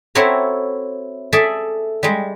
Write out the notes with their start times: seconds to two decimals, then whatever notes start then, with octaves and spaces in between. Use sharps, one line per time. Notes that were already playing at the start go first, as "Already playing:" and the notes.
0.15 C4 E4 F#4 A4 C#5 A#5
1.33 G#4 A4 D5 E5 A5
2.03 G3 G#3